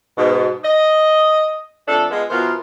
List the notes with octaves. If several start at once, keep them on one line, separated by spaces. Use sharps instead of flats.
G#2 B2
D#5
F2 A3 D4 A4
G#3 B3 F4
B2 E3 B3 F4 A#4 C5